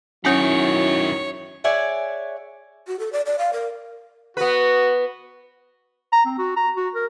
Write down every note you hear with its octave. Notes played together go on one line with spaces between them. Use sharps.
F#2 D#3 F#3 C#4 E4 C#5 G#5
G#4 C#5 D5 E5 F#5 G#5
F#4
A4
D5
D5
F5
A#4
B3 F#4 B4
A#5
C4
F#4
A#5
F#4
A#4